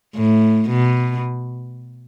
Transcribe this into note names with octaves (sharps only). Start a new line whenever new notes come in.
A2
B2